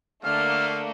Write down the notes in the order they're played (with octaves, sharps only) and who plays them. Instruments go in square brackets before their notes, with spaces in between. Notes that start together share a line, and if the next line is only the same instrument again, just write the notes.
[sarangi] D3 [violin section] A3 A#3 [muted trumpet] F5 [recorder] F6